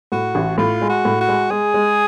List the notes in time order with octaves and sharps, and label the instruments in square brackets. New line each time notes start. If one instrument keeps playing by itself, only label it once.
[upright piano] A2 [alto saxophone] F#4
[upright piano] A1
[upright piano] A2 [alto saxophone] F4
[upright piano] G#3
[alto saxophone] F#4
[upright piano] A2
[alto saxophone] F#4
[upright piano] G#3
[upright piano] G#3 [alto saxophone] G#4
[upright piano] G#3